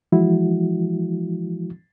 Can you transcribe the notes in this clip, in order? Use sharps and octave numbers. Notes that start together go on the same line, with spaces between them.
E3 F3 G#3 E4 F#4